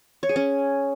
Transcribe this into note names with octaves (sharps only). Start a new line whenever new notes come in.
C#5
G#4
C#4